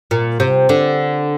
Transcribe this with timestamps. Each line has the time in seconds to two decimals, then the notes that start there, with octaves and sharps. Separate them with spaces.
0.11 A#2
0.40 C3
0.69 D3